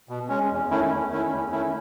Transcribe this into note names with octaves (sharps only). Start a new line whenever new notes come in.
B2
G#3 C#4
E2
D#3 A3 C#4 E4
E2
D#3 A3 C#4 E4
E2
D#3 A3 C#4 E4